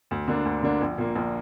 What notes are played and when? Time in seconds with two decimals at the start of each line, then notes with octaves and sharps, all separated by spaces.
0.11 D2
0.28 D3 A#3 D4
0.45 D2
0.63 D3 A#3 D4
0.81 A#1
0.98 A#2 A#3
1.15 A#1